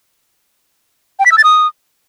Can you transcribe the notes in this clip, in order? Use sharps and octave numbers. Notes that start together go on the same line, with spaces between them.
G5
B6
E6
A6
D#6